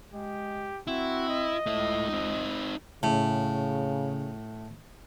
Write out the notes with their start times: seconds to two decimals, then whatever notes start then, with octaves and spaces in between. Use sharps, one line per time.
0.13 G#3 G4
0.87 C4 E4 F#4
1.29 D#5
1.66 C#2 A3 E4
2.09 C4 D#4
3.03 A2 C#3